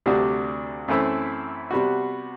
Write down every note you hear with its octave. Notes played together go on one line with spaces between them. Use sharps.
D2 C3 G3 D4 F#4
F#2 E3 A3 C4 E4
C3 G3 B3 F#4